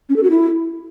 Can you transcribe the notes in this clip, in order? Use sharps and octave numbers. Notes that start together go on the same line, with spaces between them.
C#4
A4
F#4
E4